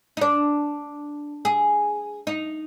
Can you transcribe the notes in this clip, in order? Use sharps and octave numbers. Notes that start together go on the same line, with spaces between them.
D#4
D4
G#4
D#4